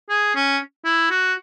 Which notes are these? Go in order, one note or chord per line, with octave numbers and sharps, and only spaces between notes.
G#4
C#4
E4
F#4